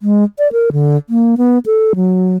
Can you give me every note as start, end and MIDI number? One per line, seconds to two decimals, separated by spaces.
0.01 0.24 56
0.39 0.51 74
0.52 0.70 70
0.72 0.97 50
1.10 1.35 58
1.38 1.58 59
1.66 1.93 69
1.96 2.37 54